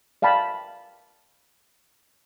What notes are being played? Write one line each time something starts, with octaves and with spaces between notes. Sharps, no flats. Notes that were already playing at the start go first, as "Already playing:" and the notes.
D5 F5 G5 A5 B5